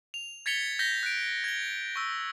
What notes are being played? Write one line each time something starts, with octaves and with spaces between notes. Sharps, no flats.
F7
G#6 A6 B6 C#7 F7 G7
G6 A#6 B6 G7
F#6 D7
G#6 G7
C#6 E6